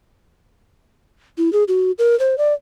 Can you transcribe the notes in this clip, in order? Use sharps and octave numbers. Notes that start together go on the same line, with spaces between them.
E4
G#4
F#4
A#4
C5
D5